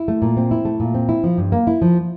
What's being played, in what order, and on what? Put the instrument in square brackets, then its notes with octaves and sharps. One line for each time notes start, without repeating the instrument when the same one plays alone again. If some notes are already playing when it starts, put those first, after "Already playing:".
Already playing: [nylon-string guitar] E4
A3
A#2
C4
E4
A3
A#2
C4
E4
F3
G2
A#3
E4
F3